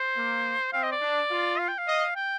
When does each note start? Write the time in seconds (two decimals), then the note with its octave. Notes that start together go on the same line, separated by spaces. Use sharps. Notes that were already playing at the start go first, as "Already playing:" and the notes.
Already playing: C5
0.16 A#3
0.73 C4 F5
0.83 D#5
0.92 D5
1.01 D4
1.31 F4
1.59 F5
1.68 G5
1.78 F5
1.88 D#5
2.16 G5